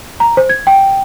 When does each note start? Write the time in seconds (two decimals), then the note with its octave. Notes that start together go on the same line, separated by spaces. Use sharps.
0.20 A#5
0.37 C5
0.49 G#6
0.67 G5